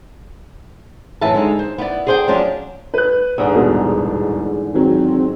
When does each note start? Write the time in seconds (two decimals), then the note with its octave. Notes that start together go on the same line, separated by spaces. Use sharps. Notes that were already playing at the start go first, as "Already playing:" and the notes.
1.21 F#2 A2 E3 B4 E5 A5
1.34 D3 G#3 D#4
1.59 C5
1.78 B3 E4 D5
2.07 G#4 A4 C5 D5 G5
2.28 F3 F#3 C#4 D4 D5
2.94 B4 F#6
3.38 E2 G#2 D3
3.52 D#1 B2 A#4
4.74 D#3 F#3 C4